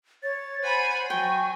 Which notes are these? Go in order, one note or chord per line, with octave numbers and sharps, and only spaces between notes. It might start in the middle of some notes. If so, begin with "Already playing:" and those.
C#5 A6
C5 F#5 G#5 B5
F#3 G5 G#5 C#6